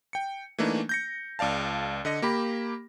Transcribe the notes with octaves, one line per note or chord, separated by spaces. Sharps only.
G5 C#7
E3 A3 A#3 D4 D#4
G6 A#6 C#7
C#2 D5 F5 A5
D3 D#5 A#6
A#3 G4 B5